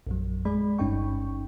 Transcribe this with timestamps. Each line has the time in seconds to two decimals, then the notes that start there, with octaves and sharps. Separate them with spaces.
0.07 A#1 F#2 F#3
0.45 G#3 G#4 D5 B5
0.78 G1 G2 C#4 D#4 G5 C#6